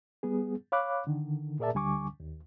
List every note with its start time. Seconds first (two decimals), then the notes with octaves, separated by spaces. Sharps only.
0.23 G3 B3 G#4
0.72 C#5 F5 B5 D6 F#6
1.07 D3 D#3
1.59 A#2 G#4 A#4 D5 E5 A5
1.74 D2 D3 G3 G#5 C#6 D6
2.20 D#2